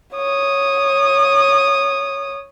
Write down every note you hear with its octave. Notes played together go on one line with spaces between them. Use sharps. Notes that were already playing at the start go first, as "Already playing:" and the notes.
C#5 D#6